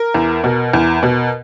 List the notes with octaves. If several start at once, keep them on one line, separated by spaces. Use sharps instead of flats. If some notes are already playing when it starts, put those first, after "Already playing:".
Already playing: A#4
E2
B2
E2
B2